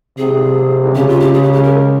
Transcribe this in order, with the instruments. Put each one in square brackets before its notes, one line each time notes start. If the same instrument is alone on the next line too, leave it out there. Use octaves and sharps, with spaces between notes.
[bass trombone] C3 [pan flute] G#4
[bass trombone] C#3 [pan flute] G4
[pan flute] F4
G4
G#4
G4
G4
A#4